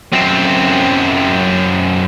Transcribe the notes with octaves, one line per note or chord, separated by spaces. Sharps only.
F#2 C4